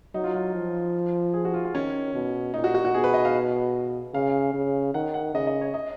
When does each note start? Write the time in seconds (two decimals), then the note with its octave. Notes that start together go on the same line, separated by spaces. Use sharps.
0.14 F#3 D#4
0.24 F4
0.34 F4
0.55 F3
1.34 G#4
1.45 F#4
1.54 F4
1.65 F4
1.74 D#3 C#4
2.15 B2
2.54 A#2 D#4
2.64 F#4
2.74 F#4
2.85 F#4
2.94 B2 G#4
3.04 B4
3.14 D#5
3.25 F5
4.14 C#3 F5
4.54 C#3
4.94 D#3 F#5
5.14 F#5
5.34 C#3 D#5
5.47 D#5
5.61 C#5
5.74 D#5